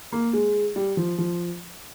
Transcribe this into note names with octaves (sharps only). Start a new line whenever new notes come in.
A#3
G#3
G3
F3
F3